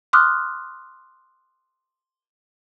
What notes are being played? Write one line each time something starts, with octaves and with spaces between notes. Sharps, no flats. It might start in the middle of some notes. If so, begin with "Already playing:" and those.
C6 D6 D#6 F6 F#6